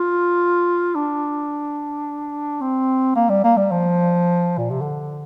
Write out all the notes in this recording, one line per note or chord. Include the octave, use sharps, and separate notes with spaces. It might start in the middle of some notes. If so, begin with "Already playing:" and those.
Already playing: F4
D4
C4
A#3
G3
A#3
G3
F3
A#2
C3
D3